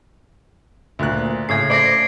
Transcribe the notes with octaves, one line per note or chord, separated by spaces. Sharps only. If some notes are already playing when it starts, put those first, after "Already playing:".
D2 A#2 F#6
A2 C#3 G#6 C7
A3 C5 D5 A#6 C7 D7